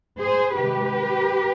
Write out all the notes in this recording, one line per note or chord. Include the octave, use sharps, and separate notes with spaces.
G#4 C5
C3 D#3 G#3 G4 B4